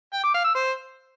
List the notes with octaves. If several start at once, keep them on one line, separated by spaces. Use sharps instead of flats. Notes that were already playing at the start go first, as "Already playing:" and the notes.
G5
D6
F5
E6
C5